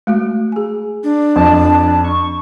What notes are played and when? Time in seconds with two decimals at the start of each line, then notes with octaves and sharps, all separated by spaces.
0.07 G#3 A3 F#4
0.52 G#4 G#5
1.04 D4
1.36 F2 A5
2.04 C#6